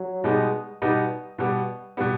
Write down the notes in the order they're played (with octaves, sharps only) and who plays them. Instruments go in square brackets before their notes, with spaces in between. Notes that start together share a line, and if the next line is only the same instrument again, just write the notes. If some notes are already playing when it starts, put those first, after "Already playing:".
Already playing: [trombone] F#3
[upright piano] B2 G3 B3 D#4 [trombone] G#3
[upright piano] B2 G3 B3 D#4
B2 G3 B3
B2 G3 B3